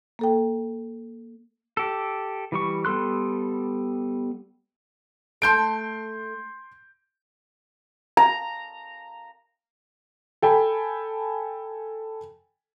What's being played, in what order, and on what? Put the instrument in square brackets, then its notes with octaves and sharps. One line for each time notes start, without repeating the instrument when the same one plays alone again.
[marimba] A#3 A4 G5
[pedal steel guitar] G4 A4
E3 G3 C#6
G3 B3 A4 C6 F#6
[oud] A3 A4 [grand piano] C6 G6 D7
[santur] A#5
[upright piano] A4 G5 G#5 B5